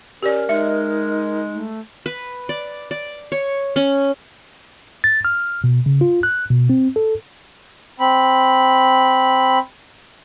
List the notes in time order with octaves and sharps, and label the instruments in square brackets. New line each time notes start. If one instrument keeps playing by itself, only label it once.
[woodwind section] C#4 [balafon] G4 D5 [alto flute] A#4
[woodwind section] G#3 [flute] D#4 [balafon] E5
[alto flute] A3
[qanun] B4
D5
D5
C#5
C#4
[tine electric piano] A6
F6
B2
C#3
F4
F#6
B2
C4
A4
[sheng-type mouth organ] C4 B5